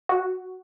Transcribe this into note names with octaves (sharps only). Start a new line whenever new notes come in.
F#4